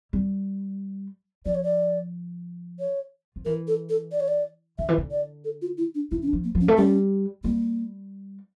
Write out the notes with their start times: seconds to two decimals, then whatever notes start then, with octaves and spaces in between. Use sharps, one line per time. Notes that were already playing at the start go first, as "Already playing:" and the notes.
0.13 G3
1.46 F3 D5
1.55 C#5
1.64 D5
2.79 C#5
3.36 F3
3.45 E3 A#4
3.68 A4
3.90 A4
4.12 D5
4.20 C#5
4.28 D5
4.79 D3 E5
4.89 E3
4.98 D3
5.11 D5
5.45 A4
5.62 F4
5.78 E4
5.95 D4
6.11 E3 E4
6.22 C#4
6.28 D4
6.33 F3
6.44 A#3
6.55 F3
6.61 C#4
6.68 A3
6.78 G3 C#4
7.44 G3 A#3